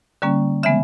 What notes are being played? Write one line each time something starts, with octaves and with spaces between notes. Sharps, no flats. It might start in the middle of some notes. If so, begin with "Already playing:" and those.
D3 G3 A#3 C#4
C#3 E3 G#3 B3 E5